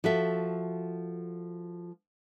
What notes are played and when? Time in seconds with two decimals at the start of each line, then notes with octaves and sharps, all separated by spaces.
0.04 F3 F#4 A4 E5